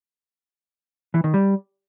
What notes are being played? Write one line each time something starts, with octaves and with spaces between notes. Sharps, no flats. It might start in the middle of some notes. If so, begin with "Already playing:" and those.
E3
D#3
G3